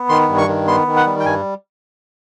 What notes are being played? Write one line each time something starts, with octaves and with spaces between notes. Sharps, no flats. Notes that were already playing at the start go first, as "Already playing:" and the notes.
Already playing: B3
D#3 C6
G2
C#6
D#3
B3 C6
D#3
F#5
G3
G5
G2 G#5